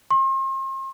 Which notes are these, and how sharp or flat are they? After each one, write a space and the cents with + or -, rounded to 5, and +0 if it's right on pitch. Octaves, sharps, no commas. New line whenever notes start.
C6 +40